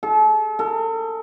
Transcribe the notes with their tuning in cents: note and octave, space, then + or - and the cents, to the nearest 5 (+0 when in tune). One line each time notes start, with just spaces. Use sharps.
A4 -40
A4 +40